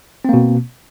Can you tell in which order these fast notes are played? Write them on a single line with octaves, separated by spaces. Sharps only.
C4 A#3 B2